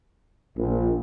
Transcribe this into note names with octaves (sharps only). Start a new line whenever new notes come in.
A#1